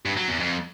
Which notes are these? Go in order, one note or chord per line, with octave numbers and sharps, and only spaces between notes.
G2
F#3
E2
F2